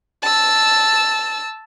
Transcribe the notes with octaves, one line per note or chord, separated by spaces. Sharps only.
A5 E6